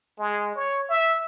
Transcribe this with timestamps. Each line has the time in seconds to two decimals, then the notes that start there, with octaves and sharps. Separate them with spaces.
0.19 G#3
0.56 C#5
0.89 E5